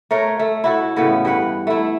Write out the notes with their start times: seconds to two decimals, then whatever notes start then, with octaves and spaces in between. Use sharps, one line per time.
0.11 A3 A#4 C#5
0.39 A3
0.64 E4 F#4 A4
0.96 A2 C#3 E3 B3
1.25 G2 B4 F#5
1.67 A3 E4